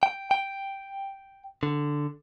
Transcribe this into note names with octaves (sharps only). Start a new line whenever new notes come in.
G5
G5
D3